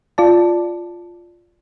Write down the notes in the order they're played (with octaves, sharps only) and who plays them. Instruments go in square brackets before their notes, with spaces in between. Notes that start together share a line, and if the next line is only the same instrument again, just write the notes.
[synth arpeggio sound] F4 D5 A5